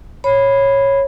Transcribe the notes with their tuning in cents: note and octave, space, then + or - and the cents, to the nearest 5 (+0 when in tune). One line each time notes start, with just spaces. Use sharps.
C#5 -15 B5 +0